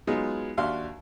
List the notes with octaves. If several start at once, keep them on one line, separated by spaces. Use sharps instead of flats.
F#3 G#3 B3 D#4 F4 G#4
D#2 D4 F#4 E5 F5 C6